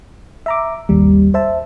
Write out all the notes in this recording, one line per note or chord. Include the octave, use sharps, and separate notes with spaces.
E5 A#5 D6
G#1 D#2 G3
C5 E5 A5